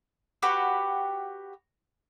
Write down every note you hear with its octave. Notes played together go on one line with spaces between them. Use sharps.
F#4 G4 B4